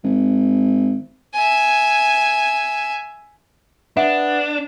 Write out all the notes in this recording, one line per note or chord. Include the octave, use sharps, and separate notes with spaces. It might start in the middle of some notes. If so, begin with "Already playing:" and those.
G#1
E5 G#5
B3 D4 E5